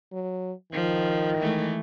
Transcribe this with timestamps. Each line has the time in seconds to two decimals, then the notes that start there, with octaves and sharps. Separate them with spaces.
0.12 F#3
0.73 D#3 F3
1.38 E3 G#3 A3